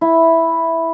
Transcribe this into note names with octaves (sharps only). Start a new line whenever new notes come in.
E4